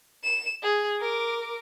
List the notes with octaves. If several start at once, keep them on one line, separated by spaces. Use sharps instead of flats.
E7
G#4
A#4 D6